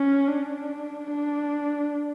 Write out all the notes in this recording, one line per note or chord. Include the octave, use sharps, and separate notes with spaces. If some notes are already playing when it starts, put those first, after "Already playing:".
Already playing: C#4
D4
D4